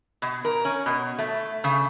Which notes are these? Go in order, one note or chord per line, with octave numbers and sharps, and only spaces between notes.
B2
A#4
C#4
B2
A3
C#3